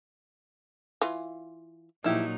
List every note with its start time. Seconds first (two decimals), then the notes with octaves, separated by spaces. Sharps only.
1.01 E3 F4
2.04 A#2 F3 F#3 D#4 E4 G4